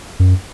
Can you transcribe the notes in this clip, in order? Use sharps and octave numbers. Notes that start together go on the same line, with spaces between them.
F#2